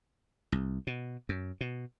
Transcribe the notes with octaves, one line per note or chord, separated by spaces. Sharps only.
C2
B2
F#2
B2